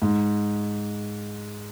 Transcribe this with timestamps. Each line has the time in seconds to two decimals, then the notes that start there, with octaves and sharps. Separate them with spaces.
0.02 G#2